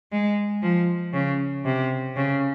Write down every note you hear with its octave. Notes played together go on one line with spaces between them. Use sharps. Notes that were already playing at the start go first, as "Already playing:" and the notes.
G#3
F3
C#3
C3
C#3